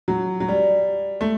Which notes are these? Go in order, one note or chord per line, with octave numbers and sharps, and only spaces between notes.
F#3
F#3
G3
A3